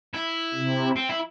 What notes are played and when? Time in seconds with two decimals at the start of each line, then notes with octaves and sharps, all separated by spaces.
0.14 E4
0.54 C3
0.96 C4
1.09 E4